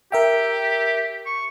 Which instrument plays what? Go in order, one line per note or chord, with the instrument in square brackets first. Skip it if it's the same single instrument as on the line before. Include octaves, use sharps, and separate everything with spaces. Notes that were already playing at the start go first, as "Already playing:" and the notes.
[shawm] G4 [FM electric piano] A#4 E5 G5
[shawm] C#6